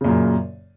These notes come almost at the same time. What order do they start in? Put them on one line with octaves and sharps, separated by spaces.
C#3 A#2 F#2